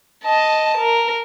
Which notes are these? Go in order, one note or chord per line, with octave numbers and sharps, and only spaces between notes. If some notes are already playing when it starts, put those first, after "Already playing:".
D#5 A5
A#4